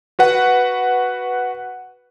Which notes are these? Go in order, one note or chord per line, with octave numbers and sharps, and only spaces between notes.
F#4 B4 F#5